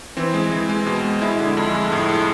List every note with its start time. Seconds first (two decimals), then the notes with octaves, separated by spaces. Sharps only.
0.17 E3 C4
0.34 G#3
0.51 E3
0.69 G#3
0.86 B2
1.04 G#3
1.22 G#3 E4
1.39 D3
1.57 F2
1.74 G#3
1.92 A2
2.09 G#3